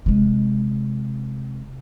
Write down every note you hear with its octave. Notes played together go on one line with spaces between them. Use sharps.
C3 G#3